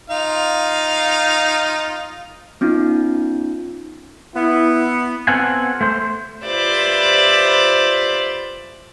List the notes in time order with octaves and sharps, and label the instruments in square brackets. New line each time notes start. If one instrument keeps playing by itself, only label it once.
[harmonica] D#4 F4 F5
[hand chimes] B3 C#4 D#4 F4
[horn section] B3 [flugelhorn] E4
[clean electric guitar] B3 C4 F4 A4 F#5 G#5
A3 C5
[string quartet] F4 G4 B4 C5 D5 E5